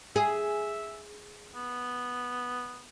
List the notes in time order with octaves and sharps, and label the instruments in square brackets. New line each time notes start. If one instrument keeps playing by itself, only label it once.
[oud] G#4 [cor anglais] E5
[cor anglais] B3